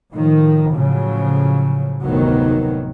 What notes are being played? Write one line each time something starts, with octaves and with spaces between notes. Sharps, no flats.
A2 D#3 F3
A2 C#3 F3 F#3
F1 D2 A2 D#3 F#3 B3